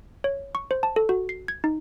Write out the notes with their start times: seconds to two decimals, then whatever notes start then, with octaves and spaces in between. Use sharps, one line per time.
0.24 C#5
0.55 C#6
0.71 C5
0.83 A5
0.96 A4
1.09 F#4
1.29 C7
1.48 G#6
1.64 D#4